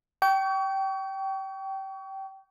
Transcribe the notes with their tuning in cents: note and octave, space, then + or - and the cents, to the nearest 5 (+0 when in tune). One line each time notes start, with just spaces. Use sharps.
G5 -20 C#6 +35